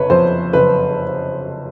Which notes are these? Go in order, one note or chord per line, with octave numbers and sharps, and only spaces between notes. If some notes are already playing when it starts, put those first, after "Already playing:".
Already playing: F#1 C3 B4 C#5
F2 C5
F#1 B4